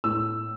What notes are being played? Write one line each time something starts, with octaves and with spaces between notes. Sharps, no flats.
A2 E6